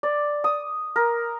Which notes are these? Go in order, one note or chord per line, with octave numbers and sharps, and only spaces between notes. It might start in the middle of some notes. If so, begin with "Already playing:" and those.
D5
D#6
A#4